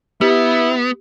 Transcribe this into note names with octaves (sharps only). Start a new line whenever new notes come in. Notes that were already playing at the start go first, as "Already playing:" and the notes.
B3 E4 G4